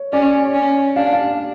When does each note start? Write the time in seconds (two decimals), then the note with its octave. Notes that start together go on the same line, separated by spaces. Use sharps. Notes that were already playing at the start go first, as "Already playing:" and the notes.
Already playing: C#5
0.13 C#4 D5
0.54 C#4
0.96 D4 F5
1.13 F5